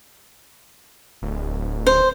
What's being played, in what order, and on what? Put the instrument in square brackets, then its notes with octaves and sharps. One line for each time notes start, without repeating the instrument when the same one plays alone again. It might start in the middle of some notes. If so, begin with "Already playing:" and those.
[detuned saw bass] D1
[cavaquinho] C5